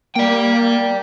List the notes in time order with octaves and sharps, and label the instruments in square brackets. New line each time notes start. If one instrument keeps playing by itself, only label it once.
[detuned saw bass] A#3 [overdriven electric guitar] D5 G5